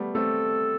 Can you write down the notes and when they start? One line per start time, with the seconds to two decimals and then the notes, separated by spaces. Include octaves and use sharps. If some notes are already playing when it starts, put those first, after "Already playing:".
Already playing: G3 A3 B3
0.15 A3 C4 A4